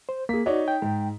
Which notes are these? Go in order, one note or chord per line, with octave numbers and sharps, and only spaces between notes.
C5
A#3 G#4 B6
D#4 F#4 C#5 D5
G5
G#2